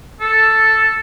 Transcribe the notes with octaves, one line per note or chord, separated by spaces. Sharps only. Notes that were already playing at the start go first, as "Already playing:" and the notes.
A4